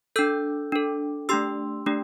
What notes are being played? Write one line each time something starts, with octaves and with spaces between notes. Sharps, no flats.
D4 A4 E6 G6
D4 A4
A3 D4 G4 C6 E6
A3 D4 G4